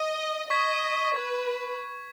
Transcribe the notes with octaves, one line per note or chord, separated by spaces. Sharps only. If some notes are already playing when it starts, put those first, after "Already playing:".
Already playing: D#5
D#5 C#6 G#6 B6
B4 C#6 G#6 B6